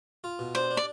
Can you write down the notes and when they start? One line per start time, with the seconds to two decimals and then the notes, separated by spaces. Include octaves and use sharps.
0.24 F4
0.39 B2
0.55 D4 C5
0.71 D4
0.77 D5